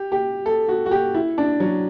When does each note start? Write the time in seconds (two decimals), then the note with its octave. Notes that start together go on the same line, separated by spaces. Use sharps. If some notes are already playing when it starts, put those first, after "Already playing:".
Already playing: G4
0.12 G4
0.46 A4
0.68 F#4
0.86 F#4
0.91 G4
1.14 E4
1.38 D4
1.60 F#3